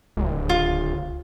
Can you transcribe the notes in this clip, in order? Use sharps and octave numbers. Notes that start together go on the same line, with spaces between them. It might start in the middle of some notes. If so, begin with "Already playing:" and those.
D1 C#2
F4